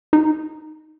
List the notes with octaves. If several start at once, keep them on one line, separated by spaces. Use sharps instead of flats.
D#4